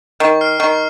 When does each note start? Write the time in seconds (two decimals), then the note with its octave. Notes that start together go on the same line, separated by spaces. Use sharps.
0.20 D#3 C#6
0.41 F6 C7
0.60 D#3 C#6